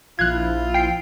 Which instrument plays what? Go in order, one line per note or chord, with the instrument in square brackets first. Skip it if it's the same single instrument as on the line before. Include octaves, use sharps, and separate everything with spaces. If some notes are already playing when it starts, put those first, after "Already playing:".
[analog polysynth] A#1 F3 E4 [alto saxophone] F4 [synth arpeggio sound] F#6 G#6
[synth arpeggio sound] G5 C7 D7